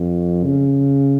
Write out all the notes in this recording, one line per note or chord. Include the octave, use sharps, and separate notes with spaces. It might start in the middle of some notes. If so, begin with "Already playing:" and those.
Already playing: F2
C#3